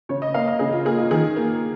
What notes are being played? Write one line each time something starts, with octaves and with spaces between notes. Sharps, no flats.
C#3 C#5
D#5
A#3 F5
D#5
C#3 G#4
F4
A#3 G#4
F4
D#3 G#4
A#3